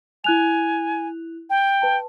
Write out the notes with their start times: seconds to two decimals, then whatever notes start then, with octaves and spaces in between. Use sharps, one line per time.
0.24 E4 G#5 F#6 F7
1.50 G5
1.82 B4 A5